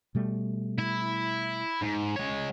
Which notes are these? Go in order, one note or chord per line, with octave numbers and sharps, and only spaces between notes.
B2 G3 A3
E4
G#2
G#3 C#5